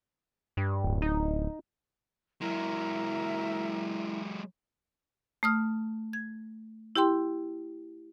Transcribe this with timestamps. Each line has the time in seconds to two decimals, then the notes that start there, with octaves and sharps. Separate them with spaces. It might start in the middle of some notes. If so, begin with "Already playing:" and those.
0.57 G2
0.84 D1
1.02 D#4
2.41 F#3 G#3 E4 A#4 E5
5.43 A3 D#6 F6
6.13 G#6
6.96 E4 G4 G5 C6